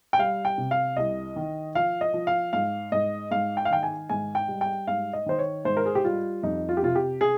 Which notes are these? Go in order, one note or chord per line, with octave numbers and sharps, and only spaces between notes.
G5
G3 F5
G5
C3
F5
C2 D#5
D#3
F3 F5
D#5
F3
F5
G#2 F5
G#2 D#5
G#2 F5
G5
F5
D#3 G5
G#5
G#2 G#5
G5
G3
G5
G#2 F5
D#5
D#3 C5
C#5
G#2 C5
A#4
G#4
G4
G3 F4
F2 D#4
F4
G4
C3 F4
G4
G#4